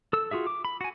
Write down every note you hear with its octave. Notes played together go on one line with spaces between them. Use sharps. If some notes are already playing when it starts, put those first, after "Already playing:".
A4 E6
F4 F#4 G#4 E5
D6
B5
F#4 G#5